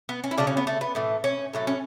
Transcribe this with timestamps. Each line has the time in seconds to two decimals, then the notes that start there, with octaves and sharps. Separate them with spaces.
0.09 B3
0.24 C#4
0.31 E4
0.38 C#3 F#3 A3 D4
0.47 C#4
0.57 B3
0.67 A3
0.81 B3
0.95 A2 E3 A3
1.24 C#4
1.53 A2 F#3 A3
1.67 C#4